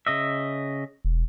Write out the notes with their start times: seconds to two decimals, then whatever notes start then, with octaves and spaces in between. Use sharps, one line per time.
0.07 C#3 D#5 E5
1.05 E1